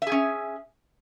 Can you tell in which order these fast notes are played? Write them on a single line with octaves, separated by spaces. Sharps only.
E5 G#4 C#4